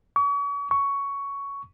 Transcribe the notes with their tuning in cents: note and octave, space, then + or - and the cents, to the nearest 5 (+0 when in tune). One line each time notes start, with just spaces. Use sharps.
C#6 +40
C#6 +10